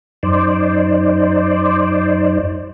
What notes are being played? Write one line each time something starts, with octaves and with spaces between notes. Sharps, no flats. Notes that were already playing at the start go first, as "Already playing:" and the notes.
F#2 D#4 C5 D5